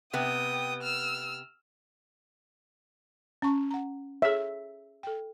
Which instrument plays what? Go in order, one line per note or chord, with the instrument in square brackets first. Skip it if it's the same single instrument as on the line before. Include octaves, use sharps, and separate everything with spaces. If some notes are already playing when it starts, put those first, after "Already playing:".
[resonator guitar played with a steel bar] C3 B3 [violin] G5 D#6
[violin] E6 F6
[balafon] C#4 A5 C#6
F#5 A#5
[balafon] G#4 C#5 [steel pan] E5
[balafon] A4 G5